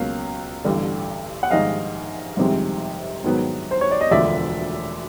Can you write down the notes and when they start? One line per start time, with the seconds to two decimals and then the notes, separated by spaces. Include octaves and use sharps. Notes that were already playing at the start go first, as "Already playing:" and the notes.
Already playing: C#2 B2 F#3 A#3 C#4 F5
0.64 A1 G2 D3
1.43 F#5
1.51 A#1 G#2 D#3 G3 D#5 F5
2.37 G1 F2 C3 D#3 G#3
3.24 G#2 D#3 F#3 B3
3.71 C5
3.81 C#5
3.91 D5
4.01 D#5
4.11 E1 D2 D3 F3 D5 E5